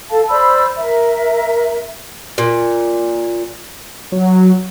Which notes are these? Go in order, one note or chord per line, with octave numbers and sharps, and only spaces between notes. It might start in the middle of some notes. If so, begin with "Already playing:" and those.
A4 F5 A5
C5 D5 B5 E6
A#4 E5
A#2
F#3